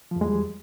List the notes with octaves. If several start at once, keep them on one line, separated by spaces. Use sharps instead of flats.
E2 F3 G3 G#3